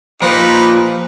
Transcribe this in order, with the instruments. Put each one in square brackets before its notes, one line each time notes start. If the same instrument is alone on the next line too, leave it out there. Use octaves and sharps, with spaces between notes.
[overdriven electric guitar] A#2 [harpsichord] F3 [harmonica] D#4 G4 B4